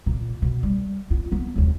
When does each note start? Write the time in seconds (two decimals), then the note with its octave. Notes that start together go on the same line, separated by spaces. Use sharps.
0.06 A#2
0.42 B2
0.63 G3
1.10 B3 F4
1.32 A#3 B3
1.55 E1 D#2